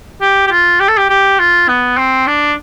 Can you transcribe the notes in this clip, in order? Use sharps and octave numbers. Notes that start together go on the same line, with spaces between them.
G4
G4
F4
G4
A4
G4
G4
F4
B3
C4
D4